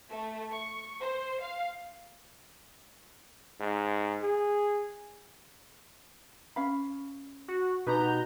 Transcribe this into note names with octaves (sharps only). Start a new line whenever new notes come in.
A3
C#6
C5
F5
G#2
G#4
C#4 F5 B5
F#4
B2 D#4 G4 B4 A#5 G6